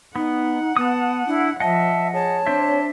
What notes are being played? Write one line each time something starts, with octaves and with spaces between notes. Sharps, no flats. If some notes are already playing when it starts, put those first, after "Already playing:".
B3 D#4 F#5
B3 A5 D#6
D4 E4
F3 D#5 E5 F#5 A5
G#4 C#5 A5
C4 D4 C5 E5